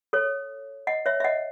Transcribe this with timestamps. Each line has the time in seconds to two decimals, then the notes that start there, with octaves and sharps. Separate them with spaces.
0.13 A4 C#5
0.87 D#5 F#5
1.06 C#5 E5
1.20 E5
1.24 D#5 F#5